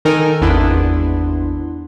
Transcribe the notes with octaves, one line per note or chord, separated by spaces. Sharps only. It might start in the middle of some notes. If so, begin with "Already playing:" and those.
D#3 D#4 A4 A#4 G#5
G#1 E2 B3 D4 E4 C6